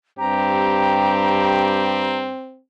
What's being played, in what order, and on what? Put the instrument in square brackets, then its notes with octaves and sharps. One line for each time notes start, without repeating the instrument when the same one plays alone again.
[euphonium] G2 [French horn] C4 [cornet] G4 [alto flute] A#5